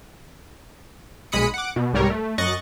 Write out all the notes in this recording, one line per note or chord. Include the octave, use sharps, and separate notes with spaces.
B1 G#3 B5 D#6 C#7
F#5 D6
B2
C2 G#2 G3 A#4 C#5
A3
F#2 D#5 C#6 F#6 A6